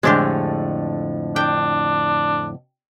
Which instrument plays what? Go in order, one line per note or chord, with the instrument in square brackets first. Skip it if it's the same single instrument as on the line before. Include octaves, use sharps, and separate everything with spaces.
[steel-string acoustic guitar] F2 A2 D3 [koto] G#3 D4 G4
[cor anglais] D4 [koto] G5